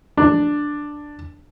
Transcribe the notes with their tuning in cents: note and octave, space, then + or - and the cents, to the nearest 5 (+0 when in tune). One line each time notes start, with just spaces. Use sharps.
D4 +5